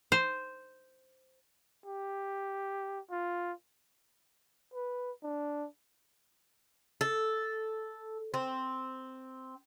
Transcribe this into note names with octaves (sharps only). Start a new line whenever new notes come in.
C5
G4
F4
B4
D4
A4
C4